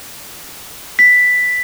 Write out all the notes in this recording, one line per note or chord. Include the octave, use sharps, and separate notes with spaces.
B6